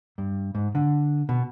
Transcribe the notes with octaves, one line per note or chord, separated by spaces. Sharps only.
G2
G#2
D3
B2